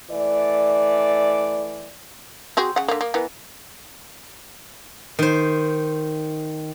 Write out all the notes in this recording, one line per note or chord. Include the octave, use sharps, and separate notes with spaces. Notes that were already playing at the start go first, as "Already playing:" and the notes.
E3 A3 D5
C4 F#4 G#4
C#3 F#5
D3 A#3
A#3
E3 B3 A#4
D#3 C5